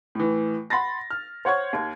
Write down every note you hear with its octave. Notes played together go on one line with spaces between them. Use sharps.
A2 E3
F#5 B5 C6 A6 A#6
F6
C5 C#5 F#5 C#6 G#6
D#2